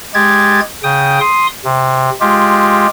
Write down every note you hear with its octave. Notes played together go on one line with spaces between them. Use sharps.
G#3 G4 G#6 A6
C#3 G5 D#6
C6 D#6
C3
G#3 F4 G4